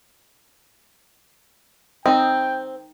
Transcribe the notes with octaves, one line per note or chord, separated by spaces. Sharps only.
C4 D#4 D#5 G5